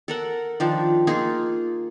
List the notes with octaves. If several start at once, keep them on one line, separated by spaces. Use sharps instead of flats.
A4 A#4 F#5
D#3 F3 D4
A#3 D#4 F4 G#4